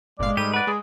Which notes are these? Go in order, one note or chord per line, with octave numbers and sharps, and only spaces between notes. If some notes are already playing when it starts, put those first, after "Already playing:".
G1 A#2 G#3 D5 F5
G#2 G3 A3 G4 D#7
B4 D5 F#5
G#3 G#4